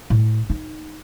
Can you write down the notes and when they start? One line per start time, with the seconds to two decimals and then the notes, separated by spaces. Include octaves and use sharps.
0.10 A2
0.50 D#4